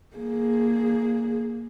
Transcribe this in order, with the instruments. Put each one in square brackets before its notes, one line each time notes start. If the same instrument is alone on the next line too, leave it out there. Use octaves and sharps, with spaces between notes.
[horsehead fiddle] A#3 G#4